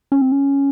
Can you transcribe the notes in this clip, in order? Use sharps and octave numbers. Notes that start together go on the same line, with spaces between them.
C#4
C4
C#4